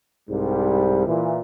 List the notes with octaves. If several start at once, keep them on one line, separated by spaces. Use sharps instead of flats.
C2 G#2 G3
A#2 E3